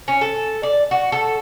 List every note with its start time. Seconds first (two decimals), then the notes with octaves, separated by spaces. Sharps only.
0.08 C#4
0.21 A4
0.63 D5
0.91 F#4
1.12 A4